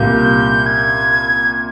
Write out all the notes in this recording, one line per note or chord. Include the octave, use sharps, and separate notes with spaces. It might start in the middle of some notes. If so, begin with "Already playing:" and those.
Already playing: C2 A#2 G3 G6
G#6